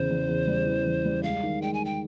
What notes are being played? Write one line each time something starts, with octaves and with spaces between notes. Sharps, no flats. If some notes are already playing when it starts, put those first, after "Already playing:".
Already playing: E2 C#3 C5
E2
E2
G3
E3
E2
G3
G#3 F5
D#3
G#3 G5
G#5
G#3 G5